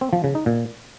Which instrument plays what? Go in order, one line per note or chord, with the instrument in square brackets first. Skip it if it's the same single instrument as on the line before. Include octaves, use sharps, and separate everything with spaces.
[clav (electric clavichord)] C4
F3
C#3
D#4
A#2